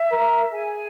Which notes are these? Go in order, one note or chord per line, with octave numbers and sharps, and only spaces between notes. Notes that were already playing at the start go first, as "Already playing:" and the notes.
Already playing: E5
A#4
G#4 G#5